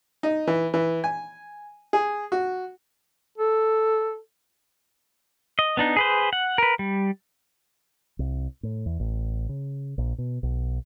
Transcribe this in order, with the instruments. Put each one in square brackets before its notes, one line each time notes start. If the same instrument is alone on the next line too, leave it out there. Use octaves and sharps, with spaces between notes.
[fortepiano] D#4
E3
E3
G#5
G#4
F#4
[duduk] A4
[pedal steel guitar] D#5
B3 D4 D#4
G#4 B4 C5
F#5
A#4 B4
G3
[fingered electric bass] C2
A2
E2
A1
C#3
A#1
B2
B1